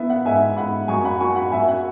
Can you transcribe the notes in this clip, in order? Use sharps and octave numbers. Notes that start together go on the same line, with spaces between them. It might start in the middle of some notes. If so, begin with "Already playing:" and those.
Already playing: E3 B3 E5
F#5
G#2 E5 G#5
G#2 F#5 B5
F#2 G#5 C#6
F#5 B5
F#3 G#5 C#6
F#5 B5
F#2 E5 G#5
F#5